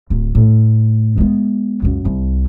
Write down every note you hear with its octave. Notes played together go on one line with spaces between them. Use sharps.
D1
A2
G#3 B3
C#2 F#2
C2